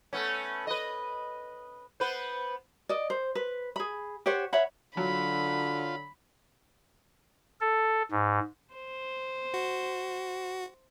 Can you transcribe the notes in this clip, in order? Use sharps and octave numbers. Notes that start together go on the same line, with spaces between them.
A3 B3 C#4
B4 D#5
B3 B4 C5
D5 D#5
C5
B4
G#4 B5
G4 C5 C#5 F#5
C#5 E5 F#5 B5
D3 F#3 F4 B5
A4
G#2
C5
F#4